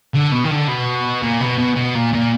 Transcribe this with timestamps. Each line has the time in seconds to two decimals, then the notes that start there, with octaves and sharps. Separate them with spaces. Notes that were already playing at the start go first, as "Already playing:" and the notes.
0.14 D3
0.31 B2
0.44 D#3
0.51 D3
0.69 B2
1.22 A#2
1.40 B2
1.58 B2
1.76 B2
1.95 A#2
2.13 A#2